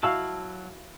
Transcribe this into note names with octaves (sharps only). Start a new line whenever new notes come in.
F#3 E4 F#4 F5 A5 E6